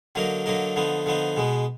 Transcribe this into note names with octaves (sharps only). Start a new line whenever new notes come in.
D3 F#3 A#3 D#4 A#4
D3 F#3 A#3 D#4 A#4
D3 F3 B3 D#4
D3 F3 B3 D#4
B2 G#3 B3